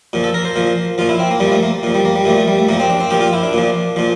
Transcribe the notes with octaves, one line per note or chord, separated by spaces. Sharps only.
A#2 F3
A4
A#4
C5
A#2 F3
A#2 F3 F4
E4
C4
A#3
A#2 F3 G3
A3
A#3
A#2 F3
G3
A#3
G3
A#2 F3 A3
A3
G3
A3
A#2 F3 A#3
C4
D4
C4
A#2 F3 G4
F4
E4
D4
A#2 F3
A#2 F3